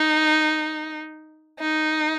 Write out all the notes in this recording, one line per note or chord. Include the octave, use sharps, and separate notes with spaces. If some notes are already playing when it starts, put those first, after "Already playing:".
Already playing: D#4
D#4